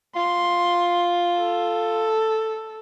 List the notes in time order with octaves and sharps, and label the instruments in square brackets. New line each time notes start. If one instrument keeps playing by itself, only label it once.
[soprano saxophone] F4 [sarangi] C6
[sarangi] A4